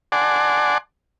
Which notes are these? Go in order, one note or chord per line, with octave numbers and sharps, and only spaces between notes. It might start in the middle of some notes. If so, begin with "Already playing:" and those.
D5 F#5 G#5 A5 C6 D6